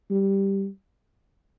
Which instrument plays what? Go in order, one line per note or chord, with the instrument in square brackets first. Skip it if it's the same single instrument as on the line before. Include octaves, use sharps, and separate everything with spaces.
[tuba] G3